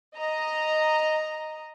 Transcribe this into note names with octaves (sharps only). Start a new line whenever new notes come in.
D#5 A#5